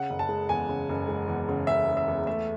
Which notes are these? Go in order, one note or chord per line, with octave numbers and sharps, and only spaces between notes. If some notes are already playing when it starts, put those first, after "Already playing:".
Already playing: C#3 F#5
F#1
A5
G#3
E2 G#5
C#3
F#1
G#3
E2
C#3
F#1 E5
G#3
E5
E2
A3 E5